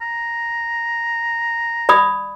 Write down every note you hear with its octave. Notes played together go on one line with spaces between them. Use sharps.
A#5
D5 B5 D#6